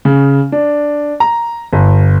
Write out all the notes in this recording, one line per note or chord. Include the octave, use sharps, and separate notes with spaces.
C#3
D4
A#5
G1